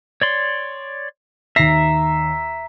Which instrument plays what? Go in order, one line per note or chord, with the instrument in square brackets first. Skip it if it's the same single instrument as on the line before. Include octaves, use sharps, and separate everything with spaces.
[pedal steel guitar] C#5 D5 C6
[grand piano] D#2 C7 [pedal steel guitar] E5 [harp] A#5